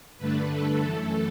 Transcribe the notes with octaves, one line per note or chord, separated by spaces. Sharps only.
G2 D3 A3 D4 B4
A4
F#2 E3 A3 A4